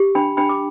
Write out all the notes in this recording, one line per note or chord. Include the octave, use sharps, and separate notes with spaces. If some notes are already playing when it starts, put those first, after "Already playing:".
Already playing: G4
D4 G5 B5
D4 G5 B5
D6